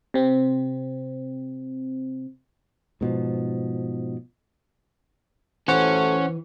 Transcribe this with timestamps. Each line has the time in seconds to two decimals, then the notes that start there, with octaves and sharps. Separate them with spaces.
0.14 C3 C4
3.01 G#2 B2 F3
5.68 A1 E3 F#3 A3 C#4 C5 F#5 C#6